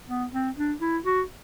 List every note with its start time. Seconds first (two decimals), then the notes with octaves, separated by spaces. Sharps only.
0.08 B3
0.33 C4
0.57 D4
0.81 E4
1.05 F#4